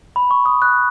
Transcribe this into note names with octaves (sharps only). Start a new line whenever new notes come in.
B5
C#6
D#6
F#6